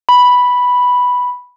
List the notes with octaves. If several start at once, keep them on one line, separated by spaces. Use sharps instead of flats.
B5